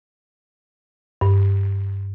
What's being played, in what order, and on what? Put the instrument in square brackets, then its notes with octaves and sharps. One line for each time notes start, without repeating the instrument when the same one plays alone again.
[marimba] G2